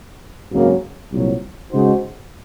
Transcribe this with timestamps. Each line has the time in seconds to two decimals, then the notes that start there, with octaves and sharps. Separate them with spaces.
0.51 G#1 F#2 C#3 F#3 A#3
1.11 C2 A#2 F#3
1.71 C#3 G#3 D#4 F#4 C5